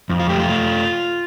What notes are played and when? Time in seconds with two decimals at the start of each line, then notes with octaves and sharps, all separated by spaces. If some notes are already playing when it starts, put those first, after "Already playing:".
0.09 F2
0.20 F4
0.29 A3 G4
0.40 F4